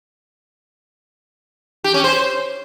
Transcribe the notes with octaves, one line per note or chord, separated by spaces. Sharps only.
G4
C#4
C5